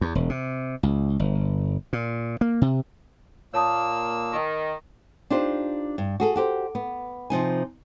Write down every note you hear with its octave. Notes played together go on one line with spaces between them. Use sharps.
E2
E1
C3
C#2
G1
A#2
A#3
C3
A#2 A#3 C#5 A5 D#6 E6
D#3
D4 D#4 F4 G4 C5
G2
F#4 G#4 A4
F#4 G4 C5
B3
C3 F3 D#4 G#5